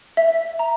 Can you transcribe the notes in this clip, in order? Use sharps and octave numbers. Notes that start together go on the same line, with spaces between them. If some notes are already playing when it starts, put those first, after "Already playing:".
E5
A#5